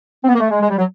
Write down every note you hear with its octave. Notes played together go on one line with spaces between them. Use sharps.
C4
B3
A#3
A3
G#3
G#3
G3
F#3